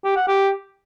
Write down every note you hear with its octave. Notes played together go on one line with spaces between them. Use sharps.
G4
F#5
G4